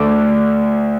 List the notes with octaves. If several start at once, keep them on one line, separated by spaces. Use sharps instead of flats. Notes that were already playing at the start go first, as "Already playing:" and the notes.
Already playing: D2 D3 A3 D4 D6